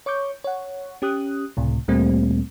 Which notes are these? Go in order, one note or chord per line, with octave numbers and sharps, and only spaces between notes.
C#5 C#6 D6 G6
C#5 F#5
C#4 G4 D#6 F#6
C#2 A2 C3
D2 A#2 G3 A3 A#3 C4